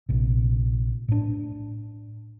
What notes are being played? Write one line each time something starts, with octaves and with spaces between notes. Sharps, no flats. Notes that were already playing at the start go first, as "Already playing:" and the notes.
A#1 C3
A2 D4